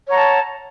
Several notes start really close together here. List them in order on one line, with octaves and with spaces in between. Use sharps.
C#5 F#5 A#5 A5